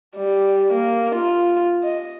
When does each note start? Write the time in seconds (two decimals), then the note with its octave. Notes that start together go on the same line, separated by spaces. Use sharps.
0.16 G3
0.73 A#3
1.15 F4
1.84 D#5